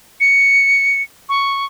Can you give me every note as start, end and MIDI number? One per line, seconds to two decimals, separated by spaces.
0.21 1.02 97
1.29 1.66 85